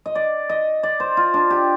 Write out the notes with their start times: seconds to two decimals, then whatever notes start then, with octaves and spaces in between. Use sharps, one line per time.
0.06 D#5
0.15 D5
0.49 D#5
0.83 D5
1.00 C5
1.17 F4
1.34 D4
1.50 G4